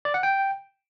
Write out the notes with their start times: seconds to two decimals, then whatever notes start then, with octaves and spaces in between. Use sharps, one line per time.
0.05 D5
0.14 F#5
0.23 G5